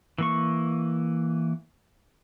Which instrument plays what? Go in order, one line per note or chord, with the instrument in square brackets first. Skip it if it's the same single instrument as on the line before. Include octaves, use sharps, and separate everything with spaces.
[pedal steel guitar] E3 A#3 C#6